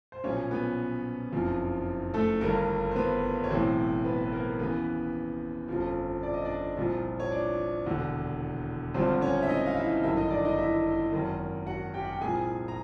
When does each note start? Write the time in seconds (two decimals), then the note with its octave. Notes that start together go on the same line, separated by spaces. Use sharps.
0.12 C5
0.24 B1 A#2 F3 C#4 C#5
0.51 B3 B4
1.32 F#1 F2 C#3 F3
2.14 A3 A4
2.41 G1 G2 D#3 A#3 A#4
2.91 C5
2.96 B3 B4
3.44 C#5
3.50 B1 A2 E3 C4 C5
4.05 B3 B4
4.25 B4
4.32 A#3 A#4
4.59 D#2 C#3 E3 B3 B4
5.68 G1 F2 C#3 F3
6.23 D5
6.34 D#5
6.45 D4 D5
6.77 C2 A#2 F3
7.20 C#5
7.31 D4 D5
7.86 E1 D#2 D3
8.94 G#1 G2 D3 F3 C4 C5
9.21 C#4 C#5
9.43 E5
9.49 D#4 D#5
9.66 F5
9.76 E4 E5
10.03 G1 F#2 D#3 E4 E5
10.17 D#4 D#5
10.30 D4 D5
10.45 D#4 D#5
10.58 E4 E5
11.13 G#1 F#2 D#3
11.66 F#4 F#5
11.94 G4 G5
12.05 F#5
12.13 G5
12.21 C2 A#2 F3 G#4 G#5
12.68 A#5